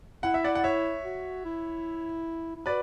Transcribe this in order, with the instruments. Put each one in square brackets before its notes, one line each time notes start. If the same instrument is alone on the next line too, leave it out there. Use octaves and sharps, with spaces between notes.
[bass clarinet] E4 [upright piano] F#5
[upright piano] E5
D5 F#5
F#5
C#5 E5
[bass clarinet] F#4
E4
E4
[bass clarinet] F#4 [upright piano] B4 D5